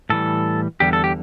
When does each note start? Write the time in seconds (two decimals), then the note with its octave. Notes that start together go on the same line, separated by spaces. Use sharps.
0.09 A2 E3 G3 A4
0.80 E2 D3 G3 G4
0.93 A4
1.04 G4